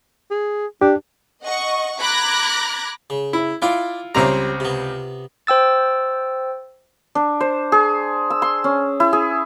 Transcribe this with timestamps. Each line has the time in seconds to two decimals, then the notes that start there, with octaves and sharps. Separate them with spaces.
0.31 G#4
0.81 D4 G4
1.43 D#5 F#5 C#6
2.00 A#5 B5 D6 F#6 G#6 A#6
3.10 C#3
3.33 E4
3.62 E4 F4 D5 G5
4.15 C#2 G3 C4 C#5 A#5
4.60 C3 B3
5.47 C5 G5 E6 A6
7.15 D4
7.40 C5
7.72 G#4
8.30 E6
8.42 C6
8.64 C#4
9.00 E4
9.13 G#4